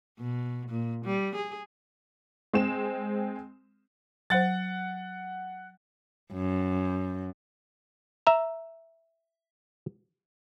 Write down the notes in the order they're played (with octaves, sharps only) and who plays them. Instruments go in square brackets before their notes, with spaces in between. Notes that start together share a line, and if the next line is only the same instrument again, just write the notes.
[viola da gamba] B2
A#2
G3
G#4
[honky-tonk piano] G#3 C4 E7
[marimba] F#3 C5 [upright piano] F#5 A6
[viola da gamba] F#2
[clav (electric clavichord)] E5 A#5